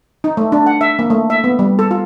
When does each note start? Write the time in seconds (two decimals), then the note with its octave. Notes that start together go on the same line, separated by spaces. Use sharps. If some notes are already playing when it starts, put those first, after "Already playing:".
0.24 D#4
0.37 A3
0.52 D4
0.66 F#5
0.81 E5
0.99 A#3
1.10 A3
1.30 E5
1.44 B3
1.59 G3
1.79 A4
1.91 F4